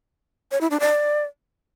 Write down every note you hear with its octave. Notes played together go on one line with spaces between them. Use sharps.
C#5
E4
D4
D5